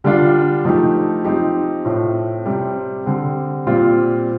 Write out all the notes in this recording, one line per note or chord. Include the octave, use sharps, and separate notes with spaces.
D3 G3 D4 F4
F3 A3 D#4 G4
F3 C4 D#4 G4
A2 A3 C4 F4
C3 G3 C4 G4
D3 G3 C4
A#2 G3 C4 F4